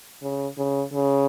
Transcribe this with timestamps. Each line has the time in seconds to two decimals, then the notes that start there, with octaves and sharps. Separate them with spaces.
0.22 C#3
0.58 C#3
0.93 C#3